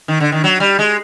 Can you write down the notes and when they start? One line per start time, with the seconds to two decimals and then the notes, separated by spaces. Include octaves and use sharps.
0.08 D#3
0.20 D3
0.32 D#3
0.44 F#3
0.60 G3
0.79 G#3